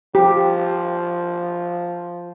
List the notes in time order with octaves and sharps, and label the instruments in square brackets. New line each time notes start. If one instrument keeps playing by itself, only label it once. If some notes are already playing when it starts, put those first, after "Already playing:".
[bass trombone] F3 [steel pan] G4